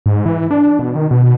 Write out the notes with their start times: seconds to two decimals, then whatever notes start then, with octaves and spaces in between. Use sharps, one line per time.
0.06 G#2
0.26 E3
0.51 D4
0.79 B2
0.95 D#3
1.11 B2